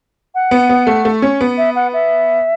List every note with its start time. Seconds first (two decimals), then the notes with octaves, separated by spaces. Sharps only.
0.35 F#5
0.51 B3
0.69 B3
0.87 A3
1.05 A3
1.22 C#4
1.41 B3
1.58 E5
1.75 F#5
1.93 E5